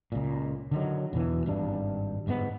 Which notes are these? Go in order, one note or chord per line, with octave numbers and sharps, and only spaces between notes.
C#2 A#2
D3 D#3 F#3
E2 B2 E3
G#1 G2 D4
G1 G#2 C#3 B3